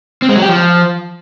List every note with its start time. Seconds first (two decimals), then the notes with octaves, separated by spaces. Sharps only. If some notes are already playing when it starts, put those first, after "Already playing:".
0.22 C4
0.29 G#3
0.36 F#3
0.42 G4
0.49 F3